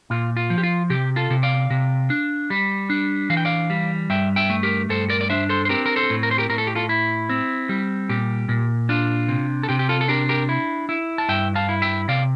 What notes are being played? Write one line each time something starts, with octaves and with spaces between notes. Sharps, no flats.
A#2 F4
F4
F3
G4
F4
C3 G4
F4 A4
C3
D5 F5
C3
D4
G3
D4
E3 F5
G5
D5 F5
G3
G2 E5 G5
E5 G5
A3
G4 A#4
G2 A4 C5
A#4 D5
D5
D4 C5 E5
A4 C5
C5
C4 G4 A#4
A#4
A4 C5
A2
A#4
C5
G4 A#4
A2 A#4
A4
G4
F4 A4
E4
C4
G3
A#2 G4
A#2
D4 F4
C3
A4
C3 G4
G4
F4 A4
A4
D4 G4 A#4
G4 A#4
E4
E4
A5
G2 E5 G5
F5 A5
E4
E5 G5
C3 D5 F5